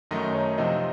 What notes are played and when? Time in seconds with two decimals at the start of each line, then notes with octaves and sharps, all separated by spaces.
0.11 F#2 D#3 F#3 A3 D#4 D#5
0.34 C#5
0.58 C3 F3 C4 D#4 D#5